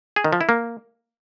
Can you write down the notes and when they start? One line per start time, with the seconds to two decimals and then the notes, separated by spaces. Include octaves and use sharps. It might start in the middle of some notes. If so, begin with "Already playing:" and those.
0.16 G#4
0.24 D#3
0.33 F3
0.41 E4
0.49 A#3